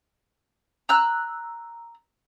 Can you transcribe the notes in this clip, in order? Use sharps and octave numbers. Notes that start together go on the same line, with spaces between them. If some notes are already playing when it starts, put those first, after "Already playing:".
A#5 E6 F#6